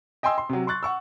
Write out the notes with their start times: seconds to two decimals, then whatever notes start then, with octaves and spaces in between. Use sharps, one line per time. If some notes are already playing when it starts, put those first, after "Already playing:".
0.23 D#5 G5 G#5 C6 E6
0.38 C6
0.49 C3 F#3
0.67 C6 C#6 F#6 A6
0.83 F#5 C#6 E6